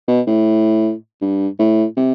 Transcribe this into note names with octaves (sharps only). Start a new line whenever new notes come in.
B2
A2
G2
A2
C3